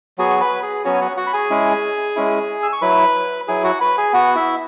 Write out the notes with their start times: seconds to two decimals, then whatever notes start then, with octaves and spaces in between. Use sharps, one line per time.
0.18 F#3 B3 F#4 G#4 G#5
0.30 C#6
0.40 B4 B5
0.63 G#4
0.84 F#3 B3 C#4 F#4 C#5
0.94 G#5
1.01 F#4 F#5
1.17 F#4 F#5
1.27 B5
1.33 G#4 G#5
1.50 G#3 C#4 E4
2.16 G#3 C#4 E4
2.63 E6
2.73 C#6
2.81 F#3 E4 B4 B5
3.48 F#3 E4 G#4 G#5
3.64 F#4 F#5
3.81 B4 B5
3.98 G#4 G#5
4.13 B3 F#4 F#5
4.35 E4 E5